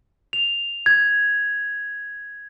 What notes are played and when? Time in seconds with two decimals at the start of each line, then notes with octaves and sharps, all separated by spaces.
0.33 F7
0.86 G#6